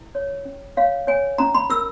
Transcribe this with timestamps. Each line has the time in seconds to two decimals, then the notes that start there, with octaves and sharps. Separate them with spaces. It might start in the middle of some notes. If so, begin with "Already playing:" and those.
Already playing: E4
0.15 C#5
0.45 C#4
0.77 C#5 F5
1.07 C#5 G#5
1.38 C#4 A#5
1.55 B5
1.70 A#4 E6